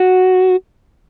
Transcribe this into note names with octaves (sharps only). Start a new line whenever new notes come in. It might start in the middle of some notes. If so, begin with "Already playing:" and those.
Already playing: F#4